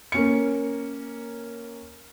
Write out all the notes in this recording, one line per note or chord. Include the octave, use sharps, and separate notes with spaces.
A#3 C#4 C#7